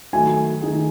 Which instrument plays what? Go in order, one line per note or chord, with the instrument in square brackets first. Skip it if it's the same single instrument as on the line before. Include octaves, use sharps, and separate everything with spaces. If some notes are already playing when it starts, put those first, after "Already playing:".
[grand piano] D#3 F#3 A3 [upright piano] G#5
[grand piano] D#3 A3 D#4 G#4